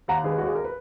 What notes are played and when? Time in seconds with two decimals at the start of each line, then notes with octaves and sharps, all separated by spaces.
0.08 D#2 F#5 A#5
0.24 D#3 G#4 B4
0.38 D#2 F#4
0.47 G#4
0.55 A#4
0.64 B4